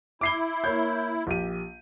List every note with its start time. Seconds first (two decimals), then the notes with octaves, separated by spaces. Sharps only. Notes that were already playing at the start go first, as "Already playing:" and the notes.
0.21 E4 D6 C7 G7
0.64 A#3 C#5 G6
1.27 A#1 G4 D#7